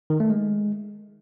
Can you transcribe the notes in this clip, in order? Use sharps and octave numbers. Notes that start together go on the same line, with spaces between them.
D#3
A3
G#3